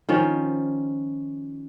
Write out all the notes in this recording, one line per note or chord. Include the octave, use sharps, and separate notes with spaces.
D#3 F3 C#4